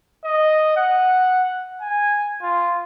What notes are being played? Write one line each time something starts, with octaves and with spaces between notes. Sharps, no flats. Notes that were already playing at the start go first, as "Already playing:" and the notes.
D#5
F#5
G#5
F4